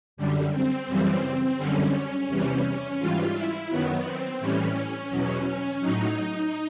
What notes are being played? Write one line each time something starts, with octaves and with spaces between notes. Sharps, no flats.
F#2 D3 G3
C4
F#2 C#3 E3 G3
F#2 D3 G3 C#4
E2 C3 E3 G3
G#2 E3 G3 F4
E4
F#2 D#3 F#3 B3
C4
A2 E3 G3 C#4
E2 B2 F#3
A2 F#3 D#4